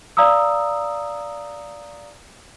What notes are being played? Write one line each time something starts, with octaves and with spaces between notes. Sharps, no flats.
D5 F5 A#5 D#6 E6